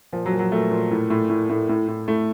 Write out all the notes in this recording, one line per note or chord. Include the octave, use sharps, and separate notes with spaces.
A#2 F3
F#3
A#2
F#3
A#2 A3
A#2
A2
A2
A2
A2
A2
A2
A2 A3